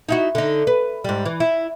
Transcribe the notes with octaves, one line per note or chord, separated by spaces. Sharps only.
D#4 E4 F#4
D3 D#4
B4
G#2 G3
E3
E4